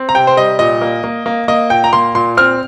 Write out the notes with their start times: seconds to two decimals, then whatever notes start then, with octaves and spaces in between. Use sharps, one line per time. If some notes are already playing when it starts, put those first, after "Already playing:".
Already playing: C4
0.09 A#5
0.15 C3 G5
0.27 C5
0.37 G3 D#5
0.59 A#2 D#5
0.81 A#3
1.04 A#3
1.26 A#3
1.48 A#3 D#5
1.70 A#2 G5
1.84 A#5
1.93 A#3 C6
2.15 A#2 C6
2.37 C4 F6